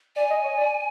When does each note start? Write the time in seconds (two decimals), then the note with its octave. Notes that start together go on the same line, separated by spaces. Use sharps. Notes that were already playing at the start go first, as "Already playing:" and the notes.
0.16 D5 G#5
0.30 D#5
0.44 C#5
0.57 D5